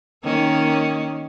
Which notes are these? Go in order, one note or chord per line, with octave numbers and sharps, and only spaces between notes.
D#3 A#3 C#4